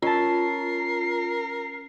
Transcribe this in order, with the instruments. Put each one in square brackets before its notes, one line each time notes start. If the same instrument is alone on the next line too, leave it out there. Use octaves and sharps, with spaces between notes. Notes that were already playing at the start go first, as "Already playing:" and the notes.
[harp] C#4 A5 [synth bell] F4 [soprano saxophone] A#4 [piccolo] C7